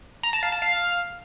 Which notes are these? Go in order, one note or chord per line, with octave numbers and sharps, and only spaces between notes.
A#5
A5
F5
A5
F5